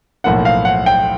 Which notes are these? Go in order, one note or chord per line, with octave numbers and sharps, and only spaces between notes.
B1 A2 F3 A#3 F#5
F5
F#5
G5